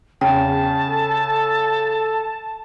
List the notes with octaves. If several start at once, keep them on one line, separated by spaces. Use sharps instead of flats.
E2 C#3 C#4 G5 A5
A4